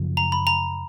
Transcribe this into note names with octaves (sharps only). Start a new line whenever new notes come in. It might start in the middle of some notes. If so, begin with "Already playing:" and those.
Already playing: F#2 C#3 F3
A#5
B5
A#5